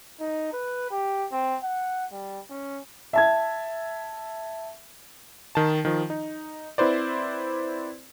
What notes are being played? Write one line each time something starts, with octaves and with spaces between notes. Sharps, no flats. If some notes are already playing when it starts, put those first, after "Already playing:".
D#4
B4
G4
C4
F#5
G3
C#4
E5 A5 G#6
D#3 A5
D#3 F3
D#4
C4 E4 B4 C5 D5